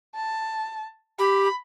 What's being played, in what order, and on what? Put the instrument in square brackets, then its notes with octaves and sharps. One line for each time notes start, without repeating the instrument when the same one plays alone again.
[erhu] A5
[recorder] G4 [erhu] B5